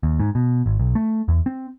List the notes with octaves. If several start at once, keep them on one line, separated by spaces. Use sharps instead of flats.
D#2
G#2
B2
G#1
B1
A3
E2
C4